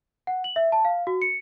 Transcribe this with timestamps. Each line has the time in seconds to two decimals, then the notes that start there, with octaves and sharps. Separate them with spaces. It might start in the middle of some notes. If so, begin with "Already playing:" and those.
0.27 F#5
0.44 F#7
0.56 E5
0.72 A5
0.85 F5
1.07 F#4
1.22 C#7